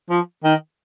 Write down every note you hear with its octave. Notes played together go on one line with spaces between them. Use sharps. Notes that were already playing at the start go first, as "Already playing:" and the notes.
F3
D#3